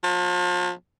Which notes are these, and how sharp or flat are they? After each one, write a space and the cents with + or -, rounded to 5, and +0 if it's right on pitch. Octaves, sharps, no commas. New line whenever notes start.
F3 +40